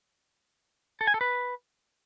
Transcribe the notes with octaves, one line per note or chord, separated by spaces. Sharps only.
A4
G#5
A4
B4